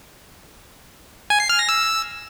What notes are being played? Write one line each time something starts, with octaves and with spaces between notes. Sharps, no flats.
G#5
C7
F6
A#6
E6